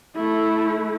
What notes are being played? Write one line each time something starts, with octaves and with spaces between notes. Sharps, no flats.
A3 E4